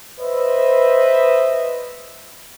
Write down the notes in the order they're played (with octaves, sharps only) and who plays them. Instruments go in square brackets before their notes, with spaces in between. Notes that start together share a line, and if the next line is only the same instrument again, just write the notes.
[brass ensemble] B4 C5 D#5 E5